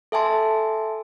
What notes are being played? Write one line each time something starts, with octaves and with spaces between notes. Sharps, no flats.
A4 E5 G#5 A5 C6